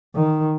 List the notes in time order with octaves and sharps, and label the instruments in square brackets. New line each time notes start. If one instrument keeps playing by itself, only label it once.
[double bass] D#3